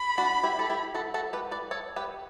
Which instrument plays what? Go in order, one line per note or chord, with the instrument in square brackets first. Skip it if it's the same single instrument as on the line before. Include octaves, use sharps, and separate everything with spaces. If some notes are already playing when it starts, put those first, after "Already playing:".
Already playing: [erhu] B5
[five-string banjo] D4 F#4
E4 G4
A4
E4 G4
F#4 A4
F#4 A4
G4 B4
B4 D5
A4 C#5
G4 B4